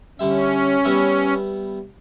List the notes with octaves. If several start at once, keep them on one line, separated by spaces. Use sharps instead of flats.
D3 G3 C#4 E5
G3 B3 E5